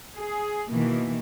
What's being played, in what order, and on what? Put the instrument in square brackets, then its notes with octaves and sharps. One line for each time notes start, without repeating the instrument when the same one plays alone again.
[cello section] G#4
B2 D#3 E3 A#3